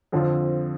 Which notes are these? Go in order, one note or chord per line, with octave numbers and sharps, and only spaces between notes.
F2 D3 F3 C4 F4